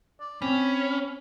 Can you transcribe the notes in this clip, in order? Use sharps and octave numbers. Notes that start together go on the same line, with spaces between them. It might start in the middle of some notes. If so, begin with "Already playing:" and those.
D5
C4 C#4 B5